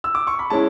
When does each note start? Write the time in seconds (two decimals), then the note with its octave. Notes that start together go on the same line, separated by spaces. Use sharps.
0.04 E6
0.15 D6
0.27 C#6
0.39 B5
0.50 G#3 C#4 E4 A5